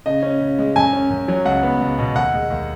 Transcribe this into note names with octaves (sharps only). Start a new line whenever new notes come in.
C#3 D#5
C#4
C#3
G#3
F#2 G#5
C#4
F#2
F#3
C#2 F#5
B3
C#2
B2
D#2 F#5
G#3
D#2